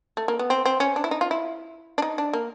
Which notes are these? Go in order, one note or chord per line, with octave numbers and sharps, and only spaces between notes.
A3
A#3
B3
C4
C4
C#4
D4
E4
D#4
F4
E4
D4
D#4
D4
A#3